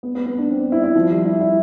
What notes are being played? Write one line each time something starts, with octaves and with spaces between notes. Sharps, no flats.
B3
B3
B3
D4
C4
C4
E4
E4
F3
G3
E4
E4